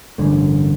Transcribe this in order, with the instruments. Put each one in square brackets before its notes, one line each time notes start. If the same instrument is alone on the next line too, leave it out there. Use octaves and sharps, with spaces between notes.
[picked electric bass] A1 G2 D3 A3